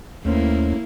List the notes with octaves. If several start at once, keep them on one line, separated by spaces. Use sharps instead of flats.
D#2 A3 A#3 C#4 E4 C5